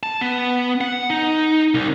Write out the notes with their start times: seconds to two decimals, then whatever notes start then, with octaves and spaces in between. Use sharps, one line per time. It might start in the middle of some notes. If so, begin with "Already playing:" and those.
0.03 A5
0.21 B3
0.81 F#5
1.10 D#4
1.74 C2